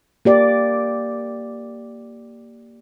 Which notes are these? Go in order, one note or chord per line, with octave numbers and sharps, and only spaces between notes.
A#3 G4 D5